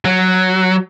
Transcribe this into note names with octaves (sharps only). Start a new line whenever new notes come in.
F#3